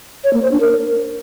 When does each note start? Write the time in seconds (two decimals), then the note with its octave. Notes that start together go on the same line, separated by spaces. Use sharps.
0.24 C#5
0.33 A#3
0.42 C5
0.52 D4
0.61 A#4